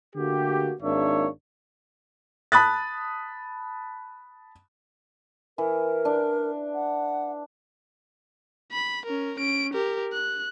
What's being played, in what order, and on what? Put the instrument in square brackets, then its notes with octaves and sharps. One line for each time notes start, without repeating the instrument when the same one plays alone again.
[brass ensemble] D3 A3 A#3 F#4 G4
G#1 G#2 A#3 D4 C#5 E5
[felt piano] A5 B5 D#6 F#6 A6
[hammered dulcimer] E3 [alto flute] A#4
[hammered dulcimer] D4
[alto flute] F#5
[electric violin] B5
C#4 A#4
C#4 D7
G4 A#4
F#6